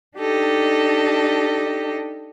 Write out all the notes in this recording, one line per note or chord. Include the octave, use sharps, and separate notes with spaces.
D4 D#4 G4 A4 D#5